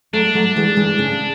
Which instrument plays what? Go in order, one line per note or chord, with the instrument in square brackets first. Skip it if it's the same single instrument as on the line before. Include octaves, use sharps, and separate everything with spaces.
[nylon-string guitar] F#3 A3 [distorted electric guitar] D4
[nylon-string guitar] F#3 A3
E3 G#3
E3 G#3
C#3